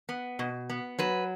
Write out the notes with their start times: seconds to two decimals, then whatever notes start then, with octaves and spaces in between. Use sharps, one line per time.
0.09 B3
0.39 B2
0.70 B3
0.99 F#3 B4